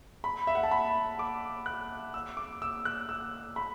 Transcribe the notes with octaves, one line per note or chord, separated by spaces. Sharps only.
B5
E5
F#5
A5
B5
D6
F#6
E6
D6
E6
F#6
E6
B5